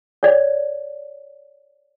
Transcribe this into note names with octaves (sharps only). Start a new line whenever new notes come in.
C#5 D5